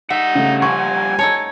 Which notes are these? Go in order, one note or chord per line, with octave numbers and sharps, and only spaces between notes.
G3 D#4 E5 F#5
C#3 A3
F3 G#5 C#6
A3 D#4 C#5 A5